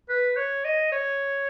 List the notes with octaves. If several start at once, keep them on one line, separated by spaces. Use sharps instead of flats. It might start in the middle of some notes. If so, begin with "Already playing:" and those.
B4
C#5
D#5
C#5